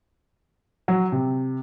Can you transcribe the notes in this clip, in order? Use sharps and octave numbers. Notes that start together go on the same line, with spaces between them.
F#3
C3